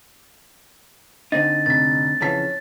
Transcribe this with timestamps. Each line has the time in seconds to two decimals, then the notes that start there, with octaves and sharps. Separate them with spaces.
1.32 D3 C4 D#4 A6
1.66 F1 A6 B6
2.21 F2 C#3 E3 C#4 A5 B6